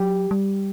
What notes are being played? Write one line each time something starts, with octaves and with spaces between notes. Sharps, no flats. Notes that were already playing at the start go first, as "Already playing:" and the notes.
Already playing: F#3 G4
G3